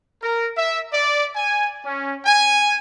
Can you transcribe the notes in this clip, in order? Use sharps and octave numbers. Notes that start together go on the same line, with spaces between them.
A#4
E5
D5
G#5
C#4
G#5